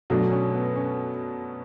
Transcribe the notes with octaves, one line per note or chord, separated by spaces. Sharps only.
B2 F#3 A3 D4
C#4
B3
C#4